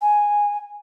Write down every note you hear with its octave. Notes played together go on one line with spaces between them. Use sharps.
G#5